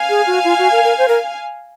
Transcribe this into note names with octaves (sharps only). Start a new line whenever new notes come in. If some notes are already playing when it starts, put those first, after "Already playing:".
Already playing: F5 G#5
G#4
F#4
F4
F#4
A#4
A#4
C5
A#4